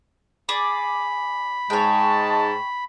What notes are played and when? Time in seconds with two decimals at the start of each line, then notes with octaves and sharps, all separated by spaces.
0.49 G#4 D5 B5
1.70 G#2 G#3 C#5 G5 A5